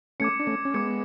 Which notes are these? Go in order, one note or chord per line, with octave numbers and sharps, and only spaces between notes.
A3 C#4 D6 G#6 C#7
D4
A3 C#4
C#4
G#3 B3 D6 G#6 C#7